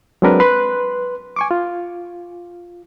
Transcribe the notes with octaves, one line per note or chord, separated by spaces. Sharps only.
F#3 G#3 C4 D4 A#4 B4
B4 C6 F#6
G#5 C#6 D6
F4